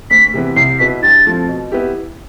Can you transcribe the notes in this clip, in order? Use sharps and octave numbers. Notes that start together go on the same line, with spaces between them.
D2 B6
C3 E3 B3
C2 C7
B2 B3 E4 B6
G2 A6
F3 A3 C4
B2
B3 E4 G4